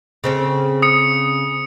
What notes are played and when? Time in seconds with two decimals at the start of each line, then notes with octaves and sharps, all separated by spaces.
0.24 C#3 C4 A4
0.82 D#6 C#7